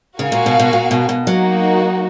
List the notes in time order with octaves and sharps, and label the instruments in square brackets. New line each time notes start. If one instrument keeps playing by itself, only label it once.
[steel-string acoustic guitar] C#3 [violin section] F#4 A#4 F5 G#5
[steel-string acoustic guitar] A#2
B2
B2
A#2
B2
B2
[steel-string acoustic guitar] F#3 [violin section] A#3 D#4 F#4